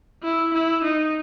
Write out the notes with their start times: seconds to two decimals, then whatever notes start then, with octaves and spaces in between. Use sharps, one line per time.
0.23 E4
0.54 E4
0.84 D#4